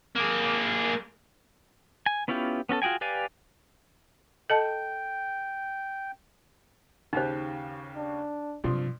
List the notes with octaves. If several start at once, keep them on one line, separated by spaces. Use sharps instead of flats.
A#3 G#4
G#5
B3 C#4 E4 F4 G4
B3 C#4 F#4 A4
F4 F#4 G#4 G5 G#5
G4 B4 D5 F5 G#5
A4 D#5 G5 A5
D#2 C#3 D#4 G4 C5
D4
G2 C3 F3 F#3 C6